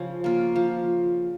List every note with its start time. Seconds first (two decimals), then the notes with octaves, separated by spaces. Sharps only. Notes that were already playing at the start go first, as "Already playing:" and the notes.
Already playing: C#3 F3 C#4
0.24 A#3 F4
0.56 F3